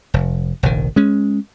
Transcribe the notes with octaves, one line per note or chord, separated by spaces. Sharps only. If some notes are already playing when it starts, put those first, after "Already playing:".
F1
F1 A#1 D#3
G#3 C#4